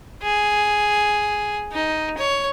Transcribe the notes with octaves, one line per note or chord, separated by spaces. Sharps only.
G#4
D#4
C#5